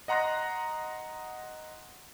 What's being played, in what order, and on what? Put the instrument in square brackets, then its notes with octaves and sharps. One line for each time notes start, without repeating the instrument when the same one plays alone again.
[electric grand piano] D#5 F#5 A#5 C6 F#6 A#6